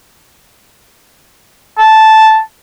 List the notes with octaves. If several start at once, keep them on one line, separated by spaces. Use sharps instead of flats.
A5